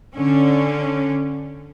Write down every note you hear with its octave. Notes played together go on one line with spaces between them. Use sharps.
D3 C#4